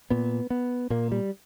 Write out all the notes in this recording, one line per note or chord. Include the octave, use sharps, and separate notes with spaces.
A#2 B3
B3
A#2 A#3
G3